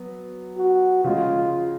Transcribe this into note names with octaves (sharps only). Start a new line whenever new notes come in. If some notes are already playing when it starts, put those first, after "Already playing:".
Already playing: F#3 B3
F#4
C#3 F3 G#3 F4